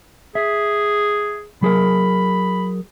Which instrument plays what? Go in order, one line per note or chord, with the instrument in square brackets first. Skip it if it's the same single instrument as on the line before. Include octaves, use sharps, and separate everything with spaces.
[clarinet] G#4 [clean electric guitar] E5
[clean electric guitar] F#3 G#4 A#4 [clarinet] B5